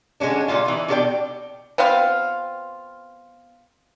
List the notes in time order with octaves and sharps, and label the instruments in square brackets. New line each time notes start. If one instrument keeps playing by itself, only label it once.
[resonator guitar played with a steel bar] D3 G#3 A#3 C#4 D4
A#2 D3 G3 F4
E3 D#4
B2 D4 F#4 A4 D5 G5
[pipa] B3 C4 F4 F5